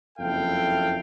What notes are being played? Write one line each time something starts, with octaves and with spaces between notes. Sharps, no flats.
F#1 F2 E4 A4 F5 G5